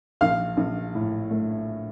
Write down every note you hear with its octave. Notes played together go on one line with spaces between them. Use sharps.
A#1 F5 F6
A#1
A2
A3